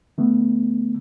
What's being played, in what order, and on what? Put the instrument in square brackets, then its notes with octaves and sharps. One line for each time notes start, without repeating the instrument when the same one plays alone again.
[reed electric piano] D3 A3 B3